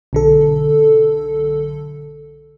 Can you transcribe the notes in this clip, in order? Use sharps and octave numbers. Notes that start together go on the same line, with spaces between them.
B1 D3 A4